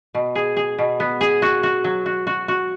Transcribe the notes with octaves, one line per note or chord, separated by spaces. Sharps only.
B2
G#4
G#4
B2
B3
G#4
F#4
F#4
F#3
F#4
F#4
F#4